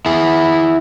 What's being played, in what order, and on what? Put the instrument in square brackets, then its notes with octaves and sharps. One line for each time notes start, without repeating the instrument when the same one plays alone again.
[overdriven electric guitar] E4 G#4